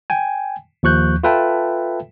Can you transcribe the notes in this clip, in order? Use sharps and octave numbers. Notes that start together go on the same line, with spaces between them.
G5 G#5
D#2 F3 C#6 F#6 G6
F4 A4 B4 E5 G5 A5